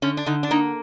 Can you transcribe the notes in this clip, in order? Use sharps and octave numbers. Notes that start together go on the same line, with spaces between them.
D3 C#4
D4
D3 D#4
D4
A#3 D#4